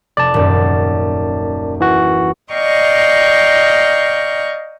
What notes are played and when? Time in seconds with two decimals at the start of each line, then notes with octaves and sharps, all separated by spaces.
0.17 F1 D5 A5
0.34 D#1 F#2
1.80 E3 F#4
2.54 D5 D#5 F5 G5 A#5 C#6